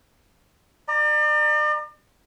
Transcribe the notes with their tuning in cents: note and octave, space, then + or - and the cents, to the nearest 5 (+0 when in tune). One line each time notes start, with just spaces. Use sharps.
D5 +40 A#5 +0